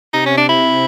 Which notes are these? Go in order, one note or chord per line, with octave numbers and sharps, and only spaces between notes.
C3 D#4
C#4
D4
E4